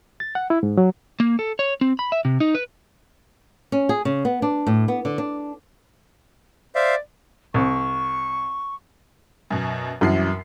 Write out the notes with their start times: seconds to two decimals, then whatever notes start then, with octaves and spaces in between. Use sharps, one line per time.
0.20 A6
0.35 F#5
0.50 E4
0.63 G#2
0.77 F#3
1.20 A#3
1.39 A4
1.59 C#5
1.81 C4
1.99 B5
2.12 E5
2.25 C3
2.40 D#4
2.55 B4
3.72 C#4
3.89 G#4
4.05 C#3
4.25 B3
4.42 D4
4.67 A2
4.88 B3
5.05 D3
5.18 D4
6.75 C5 D5 E5 F5
7.54 C2 C#6
9.51 F#2 B2
10.01 C2 F#2 E3 C7